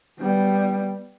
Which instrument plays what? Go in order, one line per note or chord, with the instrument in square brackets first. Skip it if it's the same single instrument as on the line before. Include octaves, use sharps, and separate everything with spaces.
[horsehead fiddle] G3 B3